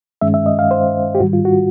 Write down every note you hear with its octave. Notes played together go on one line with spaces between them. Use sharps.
G2 D#3 G#3 C#4 E5
E5
D#5
F5
C5
G4
G#2 D#3 G3 F#4
F4
F#4